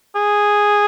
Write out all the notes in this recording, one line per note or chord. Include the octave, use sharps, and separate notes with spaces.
G#4